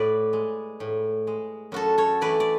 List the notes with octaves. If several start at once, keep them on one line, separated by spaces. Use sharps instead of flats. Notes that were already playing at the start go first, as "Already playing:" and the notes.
Already playing: A2 B4 D5
G#3
A2
G#3
F#2 F#4 A4
A4 C#5
E3 A3 B4 D5
D5